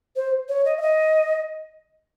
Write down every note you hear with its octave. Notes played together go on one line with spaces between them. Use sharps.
C5
C#5
D#5
E5
D#5